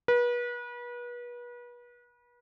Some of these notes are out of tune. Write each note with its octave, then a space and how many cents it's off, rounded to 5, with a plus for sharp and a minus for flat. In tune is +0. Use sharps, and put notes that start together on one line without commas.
B4 -35